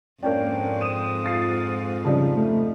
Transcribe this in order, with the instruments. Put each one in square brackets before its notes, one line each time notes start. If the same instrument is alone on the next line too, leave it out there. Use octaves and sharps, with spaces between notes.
[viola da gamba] F2 G#2 [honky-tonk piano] A#3 C#4 D4 [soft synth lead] G5
[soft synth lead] D#6 [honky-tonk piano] D#7 E7
[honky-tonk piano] F4 A6 C7
[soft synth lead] C#3 [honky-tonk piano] F3 G3 D#4
[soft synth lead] A3